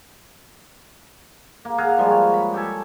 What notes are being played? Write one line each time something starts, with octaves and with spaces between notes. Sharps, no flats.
A#3
G#4 F5 F#5 A#5
F3 G3 G#3
C#5
B5
G4 A4 G#5